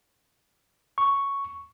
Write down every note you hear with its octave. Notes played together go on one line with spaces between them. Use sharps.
C#6